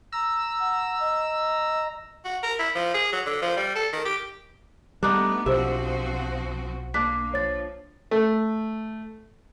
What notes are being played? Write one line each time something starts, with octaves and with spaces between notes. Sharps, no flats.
A#5 E6
F#5
D#5
F#4
A#4
E4
F3
G#4
F#3
D3
F3
G3
A4
D#3
G4
G3 A3 B3 D4 D#4
B1 F3 C4 F#4 G4 C5 E5
A#3 D4 B6
F3 C#5 A6
A3